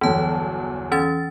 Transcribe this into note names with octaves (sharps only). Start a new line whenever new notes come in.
G1 E2 E3 F#3 A5
E3 C#4 A6